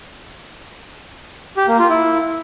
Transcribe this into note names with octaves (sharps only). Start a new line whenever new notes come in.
G4
A#3
F4
E4